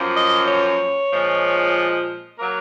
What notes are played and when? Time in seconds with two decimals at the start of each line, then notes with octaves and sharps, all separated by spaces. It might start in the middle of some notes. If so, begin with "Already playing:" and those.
Already playing: F#2 F3 A#3
0.15 D#5
0.48 C#5
1.11 A#2 F3 G#3
2.39 F#3 A#3 A#4